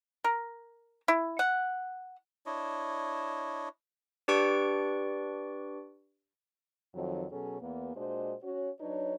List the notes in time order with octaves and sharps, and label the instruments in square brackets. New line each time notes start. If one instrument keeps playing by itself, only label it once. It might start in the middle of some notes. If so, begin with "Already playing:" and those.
[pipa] A#4
E4
F#5
[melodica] D4 E4 C#5 D#5
[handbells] D4 G4 B4 D5 C#6 D7
[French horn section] F2 D#3 F#3
B2 F#3 C#4 G#4 A4
E2 A#3 B3
A#2 G#3 D4 F#4 C5 D#5
C#4 F#4 C#5
F#3 D4 D#4 B4 C#5